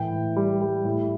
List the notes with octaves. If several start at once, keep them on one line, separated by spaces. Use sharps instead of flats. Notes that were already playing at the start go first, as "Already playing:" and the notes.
Already playing: A2 E3 G5
A2
G3
G3
A2